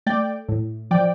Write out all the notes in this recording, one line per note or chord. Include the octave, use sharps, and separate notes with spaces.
A3 D5 G5
A2
F3 D5 G5